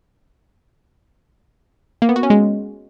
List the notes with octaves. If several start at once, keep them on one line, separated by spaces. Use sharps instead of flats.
A#3
B3
F#4
C#4
G#3